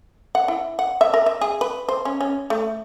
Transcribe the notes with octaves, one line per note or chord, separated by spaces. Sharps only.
F#5
E4
F#5
E5
A#4
E5
G#4
B4
C5
C#4
C#4
A3